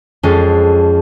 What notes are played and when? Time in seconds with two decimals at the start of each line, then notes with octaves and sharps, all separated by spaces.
0.23 F2 G#3 C#4 A4